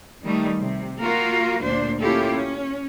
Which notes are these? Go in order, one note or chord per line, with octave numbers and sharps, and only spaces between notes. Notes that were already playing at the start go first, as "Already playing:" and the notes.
D#3 G3 A3 D#4
C3
A#3 F4 F#4 A#4
D2 A#2 D4 C5
A#3 C#4 E4 F4 G4 A4
C#4